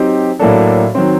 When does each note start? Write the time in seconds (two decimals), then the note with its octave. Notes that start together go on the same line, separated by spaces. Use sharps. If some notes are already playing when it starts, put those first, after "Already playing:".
Already playing: F#3 C4 D#4 G4
0.39 A2 F#3 A#3 D4 A4
0.95 D#3 F#3 C4